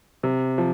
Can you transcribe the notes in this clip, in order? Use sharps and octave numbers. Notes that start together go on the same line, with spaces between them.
C3
F3